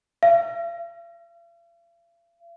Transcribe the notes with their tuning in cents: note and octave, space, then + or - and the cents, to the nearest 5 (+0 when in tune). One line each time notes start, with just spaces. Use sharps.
F5 -45